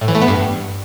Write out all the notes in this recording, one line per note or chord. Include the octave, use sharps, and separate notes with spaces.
A2
E3
A3
B3
G2